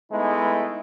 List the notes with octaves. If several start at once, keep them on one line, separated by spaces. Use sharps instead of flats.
G#3 A3 B3 D#4 E4